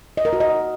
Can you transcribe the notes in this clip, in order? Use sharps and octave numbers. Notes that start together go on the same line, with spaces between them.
D#5
A#4
F#4
D#5